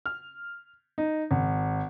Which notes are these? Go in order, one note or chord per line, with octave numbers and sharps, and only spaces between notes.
F6
D#4
G#1